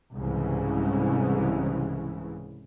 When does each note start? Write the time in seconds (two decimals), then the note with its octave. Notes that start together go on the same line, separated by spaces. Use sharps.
0.14 C2 G#2 C#3 E3